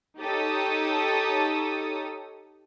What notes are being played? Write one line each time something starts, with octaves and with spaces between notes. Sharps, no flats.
D#4 G4 A4 C#5 D#6